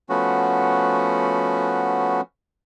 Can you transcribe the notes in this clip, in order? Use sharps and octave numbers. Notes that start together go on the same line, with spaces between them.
F3 A3 B3 C#4 F#4